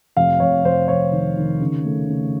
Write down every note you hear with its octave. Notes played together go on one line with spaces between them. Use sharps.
F1 F5
F1 C#5
F1 C5
F1 C#5
D#3
D#3
C#3
A3
C#3